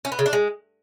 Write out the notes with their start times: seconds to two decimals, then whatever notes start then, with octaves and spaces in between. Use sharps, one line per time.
0.05 C#4
0.12 B3
0.19 C#3
0.26 D4
0.33 G#3